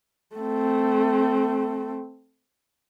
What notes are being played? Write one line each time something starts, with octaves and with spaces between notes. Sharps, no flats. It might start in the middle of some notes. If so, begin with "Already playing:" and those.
A3 C4